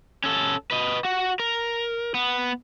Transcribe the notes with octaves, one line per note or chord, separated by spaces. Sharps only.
C#4 A4
B4 D#5
F#4
A#4
B3